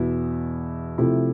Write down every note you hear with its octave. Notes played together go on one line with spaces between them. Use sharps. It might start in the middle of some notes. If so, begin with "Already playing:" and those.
Already playing: E2 B2 B3 E4
C3 F3 A3 E4